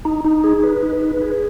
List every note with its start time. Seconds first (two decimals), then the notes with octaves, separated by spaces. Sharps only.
0.05 D#4
0.25 D#4
0.44 G#4
0.63 B4
0.83 D#4
1.02 B4
1.22 G#4